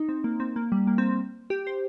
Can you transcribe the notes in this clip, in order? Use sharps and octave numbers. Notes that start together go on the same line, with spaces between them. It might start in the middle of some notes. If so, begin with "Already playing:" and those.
Already playing: D#4
C4
A#3
C4
A#3
G3
A#3
C4
G4
C5